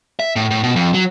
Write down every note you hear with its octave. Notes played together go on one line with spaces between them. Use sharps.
E5
A2
A2
B2
F2
F#3